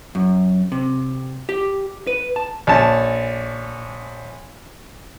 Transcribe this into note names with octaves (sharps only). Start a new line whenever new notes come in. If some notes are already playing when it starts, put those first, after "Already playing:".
F#2
C3
G4
B4
A5
A#1 C#4 A5